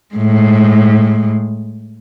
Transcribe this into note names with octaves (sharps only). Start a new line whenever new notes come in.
A2 G#3